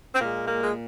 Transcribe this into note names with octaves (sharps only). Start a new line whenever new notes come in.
C4
A#2 G#3 A#3
A#3
G#3